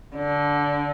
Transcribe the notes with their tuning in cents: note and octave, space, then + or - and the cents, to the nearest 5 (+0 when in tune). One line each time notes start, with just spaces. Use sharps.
D3 -15